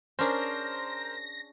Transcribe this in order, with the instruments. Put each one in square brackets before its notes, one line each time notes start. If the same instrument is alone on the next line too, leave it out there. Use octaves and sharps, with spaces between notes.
[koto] C#4 D4 G#4 [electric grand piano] A#4 C5 [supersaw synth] A#6